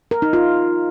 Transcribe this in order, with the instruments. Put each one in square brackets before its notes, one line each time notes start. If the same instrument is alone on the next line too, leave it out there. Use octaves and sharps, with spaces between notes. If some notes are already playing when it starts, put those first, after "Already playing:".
[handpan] A#4
D#4
F4